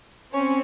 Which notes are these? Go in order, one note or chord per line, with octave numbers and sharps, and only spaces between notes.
C4 C#4 C#5